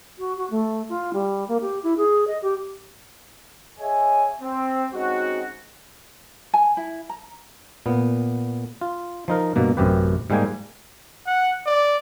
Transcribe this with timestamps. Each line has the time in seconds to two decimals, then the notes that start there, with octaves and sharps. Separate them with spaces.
0.18 F#4
0.37 F#4
0.50 A3
0.89 F4
1.13 G3
1.47 A#3
1.60 G4
1.83 E4
1.97 G#4
2.27 D#5
2.42 G4
3.79 G#4 C#5 D#5 E5 G#5
4.41 C4
4.93 G#3 C4 C#4 D#4 F#4
6.54 G#5
6.77 E4
7.09 A#5
7.86 A#2 B3
8.81 F4
9.28 F3 D#4 A#4
9.56 G2 B2 A#3
9.77 A1 F#2 C3 G4 B4
10.30 G#2 G3 G#3 A#3 G5 G#5
11.27 F#5
11.66 D5